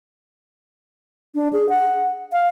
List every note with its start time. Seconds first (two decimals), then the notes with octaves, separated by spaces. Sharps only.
1.35 D4
1.53 G#4
1.69 F#5
2.32 F5